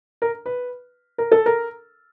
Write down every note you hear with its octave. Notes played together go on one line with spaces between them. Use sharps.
A#4
B4
A#4
A4
A#4